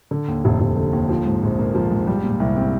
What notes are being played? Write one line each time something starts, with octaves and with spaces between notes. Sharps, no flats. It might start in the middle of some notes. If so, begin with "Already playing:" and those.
D3
D#2
F1
F1
D3
D#2
F3
G#2
A#1
A#3
F3
G#2
G3
A#2
C2
C4